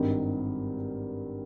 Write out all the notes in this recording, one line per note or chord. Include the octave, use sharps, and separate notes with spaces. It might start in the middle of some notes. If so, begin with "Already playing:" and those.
Already playing: G#1 G2 D#3